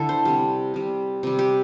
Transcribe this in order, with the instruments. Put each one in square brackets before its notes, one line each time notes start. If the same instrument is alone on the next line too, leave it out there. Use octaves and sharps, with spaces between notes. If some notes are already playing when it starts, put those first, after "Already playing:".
Already playing: [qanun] D3 E4 A4
C5
C3 G3
C3 G3
C3 G3
G4